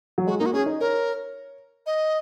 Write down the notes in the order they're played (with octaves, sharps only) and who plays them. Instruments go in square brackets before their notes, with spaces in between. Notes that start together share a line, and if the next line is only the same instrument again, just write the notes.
[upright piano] F#3
[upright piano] G#3 [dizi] F#4
[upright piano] A#3 [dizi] D#4
[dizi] F#4
[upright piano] C#4 [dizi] G#4
[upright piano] D#4
[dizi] A#4 [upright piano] C#5
[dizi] D#5